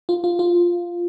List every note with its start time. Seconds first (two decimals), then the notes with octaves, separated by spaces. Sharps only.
0.09 F4
0.24 F4
0.39 F4